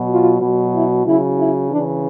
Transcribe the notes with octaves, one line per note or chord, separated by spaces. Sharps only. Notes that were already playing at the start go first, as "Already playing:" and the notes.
Already playing: B2 F#3
F4
B2 F#3
E4
C#3 F#3 E4
E4
C#3 E3 D4